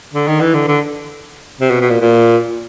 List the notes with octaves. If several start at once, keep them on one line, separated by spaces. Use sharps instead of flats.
D3
D#3
E3
D3
D3
C3
B2
B2
A#2
A#2